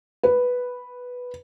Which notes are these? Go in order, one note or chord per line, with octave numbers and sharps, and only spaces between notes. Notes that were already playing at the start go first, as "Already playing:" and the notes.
B4